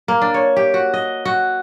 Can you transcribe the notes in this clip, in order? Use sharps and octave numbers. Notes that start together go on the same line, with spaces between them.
A#3
D4
C#5
G4
F#4
D#5
F#4